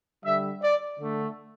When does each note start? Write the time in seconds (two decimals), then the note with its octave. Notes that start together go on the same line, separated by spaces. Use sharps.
0.25 D3 G3 E5
0.63 D5
1.00 D3 A3